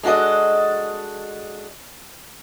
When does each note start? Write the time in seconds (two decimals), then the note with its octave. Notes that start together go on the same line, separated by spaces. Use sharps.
0.03 G#3 D4 F#4 A4 D#5